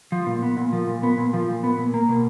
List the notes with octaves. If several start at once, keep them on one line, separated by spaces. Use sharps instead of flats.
F3
A#2
B3
A#2
F3
A#2
B3
A#2
F3
A#2
B3
A#2
A#3
B2